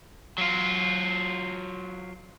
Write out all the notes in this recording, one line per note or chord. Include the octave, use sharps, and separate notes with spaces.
F#3 F4